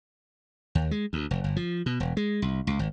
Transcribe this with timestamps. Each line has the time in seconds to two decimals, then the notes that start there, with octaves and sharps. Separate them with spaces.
0.75 D#2
0.91 G#3
1.13 D2
1.31 F1
1.44 G1
1.56 F3
1.86 B2
2.00 E1
2.17 G#3
2.42 C2
2.67 C#2
2.79 G#1